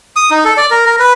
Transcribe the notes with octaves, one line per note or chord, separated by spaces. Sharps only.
D#6
D#4
A4
D5
A#4
A#4
B4